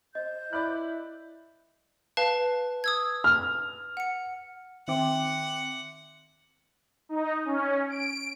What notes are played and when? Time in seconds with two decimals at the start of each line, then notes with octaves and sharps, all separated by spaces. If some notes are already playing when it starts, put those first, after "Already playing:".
0.15 C5 D#5 G6
0.53 E4 D5 B5 F#6
2.17 B4 F5 A5
2.84 D#6 E6 G#6
3.24 F6
3.97 F#5 C#7
4.88 D#3 C4 E5 F#5 G5 C6 D6
7.09 D#4
7.45 C#4
7.90 D7